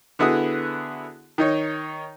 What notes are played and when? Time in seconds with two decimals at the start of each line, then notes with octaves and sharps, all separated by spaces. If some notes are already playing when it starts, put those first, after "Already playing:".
0.19 D3 B3 E4 F#4 G#4 D#6
1.38 D#3 D#4 C#5